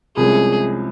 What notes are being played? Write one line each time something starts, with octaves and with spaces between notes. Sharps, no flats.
C2 C3 F3 G#3 C#4 G#4